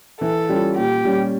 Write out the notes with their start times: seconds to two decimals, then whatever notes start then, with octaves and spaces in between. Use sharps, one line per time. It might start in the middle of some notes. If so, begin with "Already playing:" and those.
0.21 E3 A4
0.49 G3 C#4 F4
0.77 A#2 G4
1.05 G3 C#4